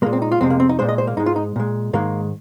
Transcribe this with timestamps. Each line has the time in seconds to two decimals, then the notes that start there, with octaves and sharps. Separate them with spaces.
0.02 G#3 A#3
0.06 A#2
0.13 C4
0.22 D#4
0.32 F4
0.41 F2 C3 G#3 C4
0.50 A#3
0.60 C4
0.69 D#4
0.79 A#2 G#3 C5
0.89 D#5
0.98 C5
1.07 A#3
1.17 G#2 D#4
1.20 G#3
1.26 F4
1.36 D#4
1.56 A#2 G#3
1.93 G#2 D#3 G#3 A#3